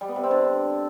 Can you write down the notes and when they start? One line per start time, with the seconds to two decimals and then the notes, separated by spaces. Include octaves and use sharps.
0.01 G3
0.08 B3
0.16 C3
0.23 C4
0.31 D3